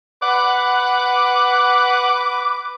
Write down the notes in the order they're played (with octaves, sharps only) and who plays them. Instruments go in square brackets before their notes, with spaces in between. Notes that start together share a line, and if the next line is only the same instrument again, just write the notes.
[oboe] B4 [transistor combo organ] F#5 [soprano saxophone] D6